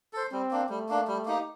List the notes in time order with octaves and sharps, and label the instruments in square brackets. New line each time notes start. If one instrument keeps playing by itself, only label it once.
[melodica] A4 C5
[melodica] G3 [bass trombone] C4
[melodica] A#3 D4
[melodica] G3 [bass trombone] A3
[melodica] A#3 D4
G3
A#3 D#4 G4